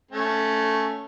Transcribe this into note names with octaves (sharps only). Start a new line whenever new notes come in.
A3 C#4